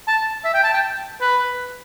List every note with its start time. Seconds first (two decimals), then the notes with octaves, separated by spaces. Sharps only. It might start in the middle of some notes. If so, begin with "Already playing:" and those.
0.07 A5
0.44 E5
0.54 G5
0.64 A5
0.74 G5
1.21 B4